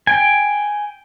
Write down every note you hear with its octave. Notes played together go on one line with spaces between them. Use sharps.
G5 G#5